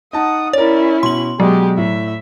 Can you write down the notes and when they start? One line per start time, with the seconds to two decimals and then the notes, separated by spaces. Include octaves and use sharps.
0.13 D#4 F#5 A5 D#6
0.53 C#4 E4 A#4 C#5 D5
1.03 B2 C6 F#7
1.40 B2 F#3 G#3 G4
1.77 A2 E5